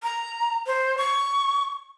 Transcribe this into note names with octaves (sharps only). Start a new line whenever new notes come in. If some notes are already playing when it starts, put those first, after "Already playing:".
A#5
C5
C#6